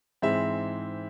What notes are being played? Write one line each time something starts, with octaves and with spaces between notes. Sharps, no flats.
G#2 E3 G#3 C4 E5